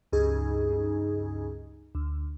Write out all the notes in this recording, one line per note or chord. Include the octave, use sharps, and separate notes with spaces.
C#2 G2 D#4 G#4
D2